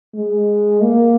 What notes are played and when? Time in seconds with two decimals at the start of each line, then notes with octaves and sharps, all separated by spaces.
0.15 G#3
0.82 A#3